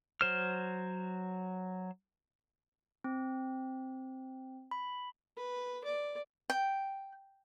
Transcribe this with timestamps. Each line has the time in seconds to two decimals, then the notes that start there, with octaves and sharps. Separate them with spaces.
0.21 F#3 C5 F6
3.04 C4
4.71 B5
5.37 B4
5.84 D5
6.50 G5